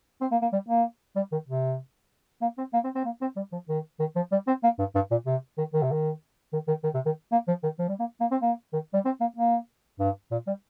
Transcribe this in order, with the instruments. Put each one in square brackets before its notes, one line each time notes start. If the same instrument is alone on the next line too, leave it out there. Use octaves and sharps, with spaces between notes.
[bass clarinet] C4
A#3
A#3
G3
A#3
G3
D#3
C3
A#3
C4
A#3
C4
C4
A#3
C4
G3
F3
D#3
D#3
F3
G3
C4
A#3
G2
G2
A#2
C3
D#3
D#3
C3
D#3
D#3
D#3
D#3
C3
D#3
A#3
F3
D#3
F3
G3
A#3
A#3
C4
A#3
D#3
G3
C4
A#3
A#3
G2
A#2
G3